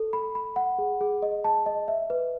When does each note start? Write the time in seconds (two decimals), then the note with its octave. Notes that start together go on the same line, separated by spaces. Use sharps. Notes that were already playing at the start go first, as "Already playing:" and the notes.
Already playing: A4
0.13 B5
0.35 B5
0.56 F#5
0.79 G#4
1.01 G#4
1.22 D#5
1.44 A5
1.66 D#5
1.88 E5
2.10 B4